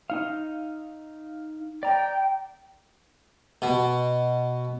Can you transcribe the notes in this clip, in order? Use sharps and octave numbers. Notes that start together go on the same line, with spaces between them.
D#4 F5
D5 G5 A#5
B2